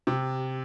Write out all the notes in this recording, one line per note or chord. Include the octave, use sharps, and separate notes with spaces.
C3